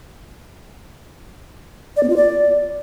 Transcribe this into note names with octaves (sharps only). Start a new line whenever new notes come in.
D5
B3
F4
D5